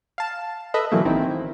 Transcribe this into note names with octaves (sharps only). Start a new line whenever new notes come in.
F5 A5
A4 B4 D#5 E5
B2 D3 E3 F#3 A3 A#3
A1 D#3 C4 E4